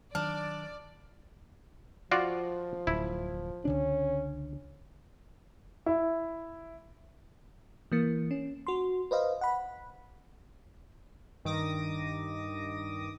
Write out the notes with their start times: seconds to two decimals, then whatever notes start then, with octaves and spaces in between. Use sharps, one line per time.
0.15 D#3 F#3 D4 D5 F6
2.11 F3 F4 F#4 D5
2.87 D1 F#2 E4
3.65 C#2 D3 C#4 D4
5.86 E4
7.92 E3 A#3
8.31 C#4
8.67 F#4 C6
9.11 B4 C5 D#5 F5
9.41 F#5 B5
11.45 G2 D#3 D6 D#6 A#6